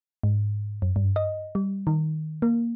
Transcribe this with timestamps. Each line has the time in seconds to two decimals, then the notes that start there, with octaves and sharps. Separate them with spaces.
0.23 G#2
0.82 F#2
0.96 G2
1.16 D#5
1.55 G3
1.87 D#3
2.42 A#3